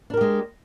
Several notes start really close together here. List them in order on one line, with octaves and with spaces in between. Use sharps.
D4 A#4 G4 G#3